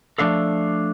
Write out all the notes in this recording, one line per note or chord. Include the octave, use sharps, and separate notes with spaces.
F3 A3 D4 A4 F5